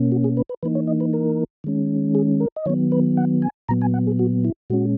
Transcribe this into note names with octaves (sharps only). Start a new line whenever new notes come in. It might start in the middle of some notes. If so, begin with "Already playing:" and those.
Already playing: B2 A#3 C#4
F#4
G#4
B4
B4
E3 A#3 D#4 B4
C#5
D#5
B4
A#4
D#3 G#3 C#4
G#4
A#4
D#5
D#3 F#3 B3 C#5
B4
F#5
G#5
A#2 F#3 B3 A#5
G#5
F#5
G#4
F#4
E4
A#2 G#3 C#4 F#4